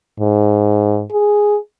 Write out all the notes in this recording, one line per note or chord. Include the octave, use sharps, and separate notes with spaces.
G#2
G#4